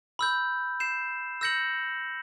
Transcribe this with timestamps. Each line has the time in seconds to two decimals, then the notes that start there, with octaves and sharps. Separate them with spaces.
0.19 B5 E6 G6
0.80 G6 C7 E7
1.41 E6 G6 A#6 C#7 F#7